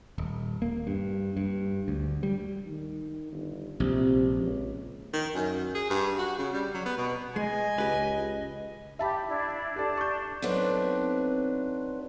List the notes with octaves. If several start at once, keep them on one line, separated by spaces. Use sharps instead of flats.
D#1
A#3
G2
G2
D2
G3
D#3
G1
A#1 C3
C#2
D#3
F#2
G#4
G2
F#4
C#3
G3
F#3
B3
B2
G#3 D#5 G#5
C#2 G4 B4
G4 E5 A5 B5
D4 E4
D4 G4 A4 D5 A5
C#6 G6
F#3 A3 B3 C4 D4 D#4